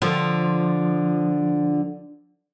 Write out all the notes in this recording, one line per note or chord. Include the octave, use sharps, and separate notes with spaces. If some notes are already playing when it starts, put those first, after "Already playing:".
D3 F3